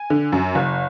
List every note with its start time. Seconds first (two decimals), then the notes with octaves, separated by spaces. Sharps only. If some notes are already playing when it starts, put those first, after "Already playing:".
Already playing: G#5
0.10 D3
0.32 F#2
0.55 F#1